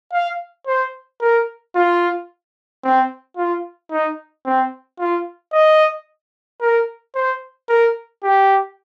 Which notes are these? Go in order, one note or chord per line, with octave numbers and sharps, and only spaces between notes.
F5
C5
A#4
F4
C4
F4
D#4
C4
F4
D#5
A#4
C5
A#4
G4